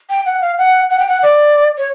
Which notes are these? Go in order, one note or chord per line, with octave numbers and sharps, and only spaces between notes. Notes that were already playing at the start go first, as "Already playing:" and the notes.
G5
F#5
F5
F#5
F#5
G5
F#5
D5
C#5